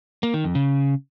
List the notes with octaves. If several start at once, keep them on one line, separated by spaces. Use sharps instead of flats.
A#3
D#3
F2
C#3